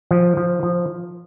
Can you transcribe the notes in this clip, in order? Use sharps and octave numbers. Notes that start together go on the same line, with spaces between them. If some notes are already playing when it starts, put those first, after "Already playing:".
F3
F3
F3